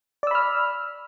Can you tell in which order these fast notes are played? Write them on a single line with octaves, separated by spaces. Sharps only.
D5 E6 B5 F6